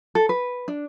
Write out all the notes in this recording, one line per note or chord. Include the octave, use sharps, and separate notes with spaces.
A4
B4
D4